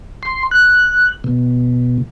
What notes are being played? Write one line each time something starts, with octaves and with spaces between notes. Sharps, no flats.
C6
F#6
B2